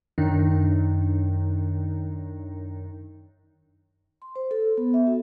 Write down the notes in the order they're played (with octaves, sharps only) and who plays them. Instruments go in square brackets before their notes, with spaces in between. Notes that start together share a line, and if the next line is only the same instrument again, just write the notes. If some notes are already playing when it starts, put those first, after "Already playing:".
[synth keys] F#2 D#3 D4 D#4
[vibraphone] C6
C5
A4
B3
E5
F#4